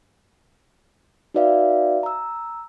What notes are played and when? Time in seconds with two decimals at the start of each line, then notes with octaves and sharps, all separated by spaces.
1.34 D#4 F#4 B4 D5 E5 F5
2.03 A#5 E6